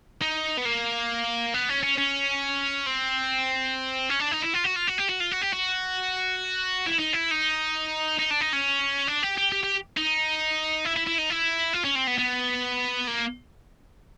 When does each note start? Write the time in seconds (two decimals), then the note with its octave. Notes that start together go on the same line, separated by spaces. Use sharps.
0.22 D#4
0.57 B3
0.65 A#3
1.54 B3
1.69 C#4
1.83 C#4
1.98 C#4
2.87 C4
4.10 C#4
4.20 D4
4.32 D#4
4.42 E4
4.54 F4
4.64 F#4
4.76 F4
4.87 F#4
4.98 G4
5.09 F#4
5.20 F4
5.31 F#4
5.42 G4
5.53 F#4
6.86 E4
6.99 D#4
7.13 E4
7.31 D#4
8.19 D#4
8.31 D4
8.41 D#4
8.53 C#4
9.08 D4
9.23 G4
9.38 G4
9.52 G4
9.63 G4
9.97 D#4
10.85 E4
10.96 E4
11.07 E4
11.18 D#4
11.30 E4
11.73 F4
11.84 C#4
11.95 C4
12.07 B3
12.18 B3
13.07 A#3